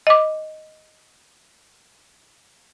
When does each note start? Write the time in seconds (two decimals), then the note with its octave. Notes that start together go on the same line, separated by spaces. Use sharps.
0.07 D#5 D6